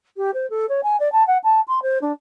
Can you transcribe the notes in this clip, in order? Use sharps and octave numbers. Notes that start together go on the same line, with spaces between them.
G4
C5
A4
C#5
G#5
D5
A5
F#5
A5
C6
C5
D4